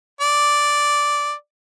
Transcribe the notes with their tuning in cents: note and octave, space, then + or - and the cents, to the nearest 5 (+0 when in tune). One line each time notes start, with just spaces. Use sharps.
D5 -5